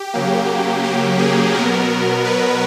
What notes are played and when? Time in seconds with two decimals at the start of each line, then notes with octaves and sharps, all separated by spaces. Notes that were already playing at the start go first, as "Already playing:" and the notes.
Already playing: G4
0.14 C#3 F#3 A#3
0.84 G4
1.19 G#4
1.54 B2 F#3 B3 A#4
2.25 B4